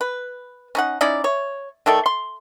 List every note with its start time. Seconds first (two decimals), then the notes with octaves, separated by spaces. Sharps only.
0.01 B4
0.75 C#4 D#4 F#5
1.01 C#4 D#4 E4 D5
1.24 C#5
1.86 D#3 A3 A4 D5
2.06 C6